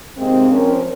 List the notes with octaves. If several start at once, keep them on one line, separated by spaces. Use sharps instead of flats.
C3 D#3 G#3 A#3 C4
F3 C4 C#4 A#4